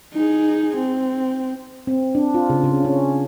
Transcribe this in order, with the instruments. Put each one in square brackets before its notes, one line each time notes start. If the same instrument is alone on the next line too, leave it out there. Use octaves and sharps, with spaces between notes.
[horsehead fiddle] D#4 G#4
C4
[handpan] C4
D4
F4
C#3
C#3
C#4